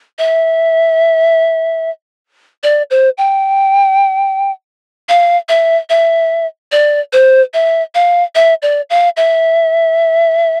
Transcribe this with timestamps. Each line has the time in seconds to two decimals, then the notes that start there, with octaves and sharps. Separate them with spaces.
0.18 E5
2.63 D5
2.90 C5
3.18 G5
5.09 F5
5.49 E5
5.90 E5
6.72 D5
7.13 C5
7.54 E5
7.95 F5
8.35 E5
8.62 D5
8.90 F5
9.17 E5